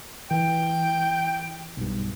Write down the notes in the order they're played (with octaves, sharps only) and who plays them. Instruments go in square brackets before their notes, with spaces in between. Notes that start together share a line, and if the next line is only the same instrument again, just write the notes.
[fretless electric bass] E3 [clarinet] G5
[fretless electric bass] B1 G2